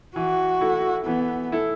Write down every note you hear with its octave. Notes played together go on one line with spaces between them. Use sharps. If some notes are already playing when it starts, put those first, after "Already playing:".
E3 F#4
A3 E4 A4
E3 B3
A3 E4 A4